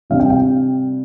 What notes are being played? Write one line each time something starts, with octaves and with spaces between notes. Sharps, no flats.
C3 G3 D4 F5
G5
G5